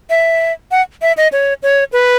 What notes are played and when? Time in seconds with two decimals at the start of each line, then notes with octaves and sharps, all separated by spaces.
0.10 E5
0.71 F#5
1.02 E5
1.17 D#5
1.32 C#5
1.63 C#5
1.93 B4